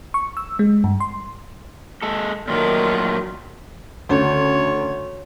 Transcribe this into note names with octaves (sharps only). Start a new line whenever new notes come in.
C#6
E6
G#3
G2
C6
G#3 A4
A#2 D#3 F#3 A3 F4
D2 C#3 C#5